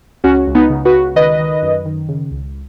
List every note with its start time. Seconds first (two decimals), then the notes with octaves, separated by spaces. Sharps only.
0.24 C#2 C#4 F#4
0.47 C#2
0.55 B3 D#4
0.70 C#3
0.85 F#4 B4
0.93 C#2
1.16 D#3 B4 D#5
1.39 D#3
1.62 F#2
1.85 D#3
2.08 C#3
2.31 C#2